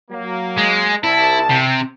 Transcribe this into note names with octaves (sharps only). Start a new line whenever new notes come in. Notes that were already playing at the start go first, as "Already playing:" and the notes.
F#3 A#3
G#3
C2 E4 A5
C3